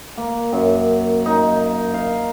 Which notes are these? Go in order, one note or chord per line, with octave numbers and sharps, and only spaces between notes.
A#3
F#2
D#4
F5